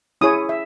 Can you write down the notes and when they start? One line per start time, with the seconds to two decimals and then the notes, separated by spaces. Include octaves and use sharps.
0.21 C#4 E4 G#4 C#5 D#6
0.49 E5